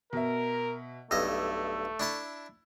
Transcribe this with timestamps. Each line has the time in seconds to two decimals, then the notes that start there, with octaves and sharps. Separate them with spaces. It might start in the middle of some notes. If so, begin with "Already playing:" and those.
0.13 B2 A#4 E5
1.11 B1 G2 A3 D#5 E6
2.00 D4 E4 A5